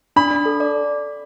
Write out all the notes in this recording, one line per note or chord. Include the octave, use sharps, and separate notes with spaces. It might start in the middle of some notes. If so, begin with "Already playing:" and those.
D4 B5
D4
A4
D5